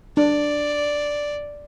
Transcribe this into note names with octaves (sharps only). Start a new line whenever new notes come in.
D4 D5